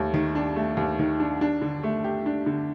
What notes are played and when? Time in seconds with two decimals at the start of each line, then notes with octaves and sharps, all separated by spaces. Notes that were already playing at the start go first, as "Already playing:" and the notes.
Already playing: D#2 A3
0.14 D#3
0.35 D4
0.56 A3
0.77 D#2
0.99 D#3
1.20 D4
1.41 D4
1.62 D3
1.83 A3
2.04 G4
2.26 D4
2.46 D3